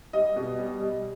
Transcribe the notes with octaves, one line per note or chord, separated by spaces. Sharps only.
G3 D#5
B2
G3
G3